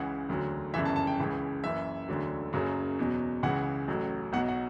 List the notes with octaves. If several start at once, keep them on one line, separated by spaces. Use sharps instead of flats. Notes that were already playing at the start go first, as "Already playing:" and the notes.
Already playing: C#2 C#3 E3 F#5
E1 D2 D3 F#3
G1 F#2 C#3 E3 E5
A5
A5
G5
C#2 C#3 E3
F#1 F#2 E3 E5
E1 D2 D3 F#3
F#1 F#2 C#3 F#3
E2 B2 F#3
C#2 C#3 E3 F#5
A1 A2 F#3
B1 B2 F#3 F#5
F#5